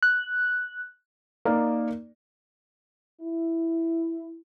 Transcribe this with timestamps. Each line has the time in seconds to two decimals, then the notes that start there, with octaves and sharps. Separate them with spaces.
0.03 F#6
1.45 A#3 D#4 A#4 D5
3.21 E4